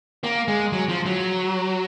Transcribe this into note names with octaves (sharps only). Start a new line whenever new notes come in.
A#3
G#3
F#3
F3
F#3